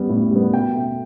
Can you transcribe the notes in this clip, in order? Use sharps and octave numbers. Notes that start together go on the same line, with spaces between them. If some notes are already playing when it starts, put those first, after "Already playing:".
Already playing: G3 B3
A2
G3 B3
B2 G5
A3